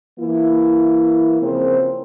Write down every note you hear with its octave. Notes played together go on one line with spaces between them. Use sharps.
E3 A#3 E4
C#3 F3 C4 A#4 C5